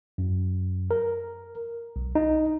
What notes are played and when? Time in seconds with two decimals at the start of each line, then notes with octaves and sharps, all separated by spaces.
0.18 F#2
0.91 A#4
1.96 B1
2.15 D#4